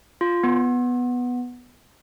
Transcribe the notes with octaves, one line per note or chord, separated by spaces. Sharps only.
F4
B3